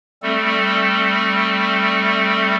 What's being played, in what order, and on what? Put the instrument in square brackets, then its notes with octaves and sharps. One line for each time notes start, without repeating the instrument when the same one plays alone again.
[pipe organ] G3 A3 C4 A4